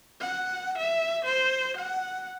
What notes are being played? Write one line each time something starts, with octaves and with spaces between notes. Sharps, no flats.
F#5
E5
C5
F#5